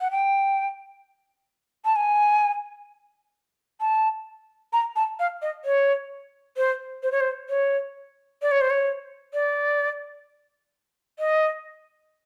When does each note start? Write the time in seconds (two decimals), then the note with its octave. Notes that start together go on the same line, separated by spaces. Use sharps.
0.01 F#5
0.11 G5
1.85 A5
1.96 G#5
3.81 A5
4.73 A#5
4.96 A5
5.19 F5
5.42 D#5
5.65 C#5
6.57 C5
7.03 C5
7.12 C#5
7.21 C5
7.49 C#5
8.42 D5
8.51 C#5
8.61 C5
8.70 C#5
9.34 D5
11.19 D#5